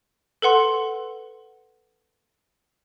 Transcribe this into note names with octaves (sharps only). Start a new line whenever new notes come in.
A4 B4 F#5 C6